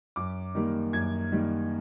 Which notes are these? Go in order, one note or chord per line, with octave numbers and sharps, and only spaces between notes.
F#2 D6
D#3 G3 A#3
F#2 G#6
D#3 G3 A#3